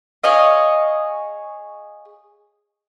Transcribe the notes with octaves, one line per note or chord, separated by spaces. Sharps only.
G#4 C#5 D#5 F5